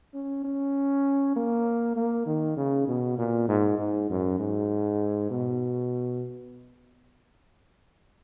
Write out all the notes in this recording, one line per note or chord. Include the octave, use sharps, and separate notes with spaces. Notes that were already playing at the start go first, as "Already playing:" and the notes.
C#4
C#4
A#3
A#3
D#3
C#3
B2
A#2
G#2
G#2
F#2
G#2
B2